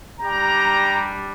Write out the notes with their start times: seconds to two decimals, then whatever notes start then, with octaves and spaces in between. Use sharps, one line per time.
0.21 G3 D4 G4 G5 A#5